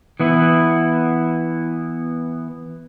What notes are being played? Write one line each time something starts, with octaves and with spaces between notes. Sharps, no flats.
E3 B3 E4